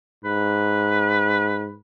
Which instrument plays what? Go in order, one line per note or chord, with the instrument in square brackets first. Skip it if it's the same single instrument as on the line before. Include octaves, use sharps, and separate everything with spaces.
[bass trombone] G#2 [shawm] B4